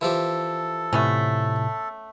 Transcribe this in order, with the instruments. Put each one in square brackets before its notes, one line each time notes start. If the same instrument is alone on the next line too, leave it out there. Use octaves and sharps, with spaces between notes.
[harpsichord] E3 F3 G4 [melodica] A4
[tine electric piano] A2 C3 [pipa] A3 B3 C#4